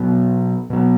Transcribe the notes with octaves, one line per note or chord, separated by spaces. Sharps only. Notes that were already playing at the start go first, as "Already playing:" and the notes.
Already playing: B2 F#3 B3
B2 F#3 B3